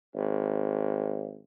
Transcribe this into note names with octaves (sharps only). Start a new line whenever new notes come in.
G#1